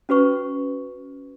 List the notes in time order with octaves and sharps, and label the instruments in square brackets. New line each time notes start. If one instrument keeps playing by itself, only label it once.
[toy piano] C#4 F#4 B4 C#6